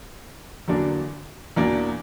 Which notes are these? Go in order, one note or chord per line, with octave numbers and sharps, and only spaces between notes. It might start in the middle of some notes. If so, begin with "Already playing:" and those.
E2 D3 F#3 A#3 D4
E2 B2 A#3 D4